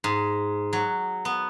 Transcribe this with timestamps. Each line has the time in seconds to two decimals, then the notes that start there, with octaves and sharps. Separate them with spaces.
0.04 G#2
0.73 F#3
1.25 B3